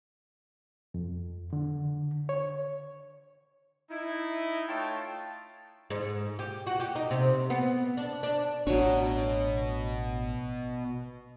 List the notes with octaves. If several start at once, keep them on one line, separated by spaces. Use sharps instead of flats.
F2
D3
C#5
D#4 E4
A3 D#4 F4 C#5 G5 A5
G#2
G4
F#4
G4
D#4
C3
B3
D4
D4
A1 B2 F#3 D4 C#5